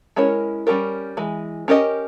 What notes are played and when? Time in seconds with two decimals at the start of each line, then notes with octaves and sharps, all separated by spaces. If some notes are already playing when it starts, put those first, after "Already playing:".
0.16 G#3 C#4 E4 A#4 C#5
0.67 G3 C#4 G4 A#4
1.17 E3 G#3
1.68 C#4 G4 A#4 D#5